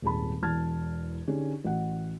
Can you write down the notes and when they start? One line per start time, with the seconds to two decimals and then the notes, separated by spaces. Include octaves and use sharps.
0.02 D#1 G#1 G#4 A5 B5
0.42 E1 E2 A5 F6 G#6 A6
1.28 D3 C#4 D#4 G4 G#4
1.64 A1 F#4 F#5